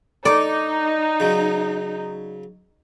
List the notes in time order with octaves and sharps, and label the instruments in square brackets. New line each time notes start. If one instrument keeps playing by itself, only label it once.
[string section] D#4 [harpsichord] A4 [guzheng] D5
[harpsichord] C#3 F#3